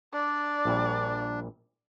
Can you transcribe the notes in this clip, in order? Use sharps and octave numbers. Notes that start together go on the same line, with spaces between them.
D4 D5
A#1 A#2 G3